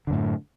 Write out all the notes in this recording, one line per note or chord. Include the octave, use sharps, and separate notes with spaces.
F#2 A2 D3